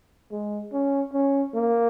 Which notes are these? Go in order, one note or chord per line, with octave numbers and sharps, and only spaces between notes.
G#3
C#4
C#4
A#3